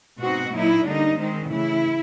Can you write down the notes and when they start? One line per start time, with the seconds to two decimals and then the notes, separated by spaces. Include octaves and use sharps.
0.18 B2 G#3 C4 D#4 F#4
0.52 A#2 F#3 A#3 D#4 E4
0.84 D3 G3 A#3 D4 D#4
1.17 D#3 G#3 C4 D#4
1.49 C#3 E3 A3 E4